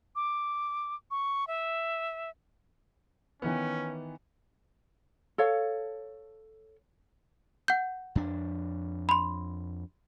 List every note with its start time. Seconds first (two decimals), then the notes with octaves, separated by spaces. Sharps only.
0.16 D6
1.11 C#6
1.47 E5
3.42 D#3 E3 B3 C#4
5.38 A4 C#5 F5
7.68 F#5 G6
8.15 F2 D4
9.09 B5 C6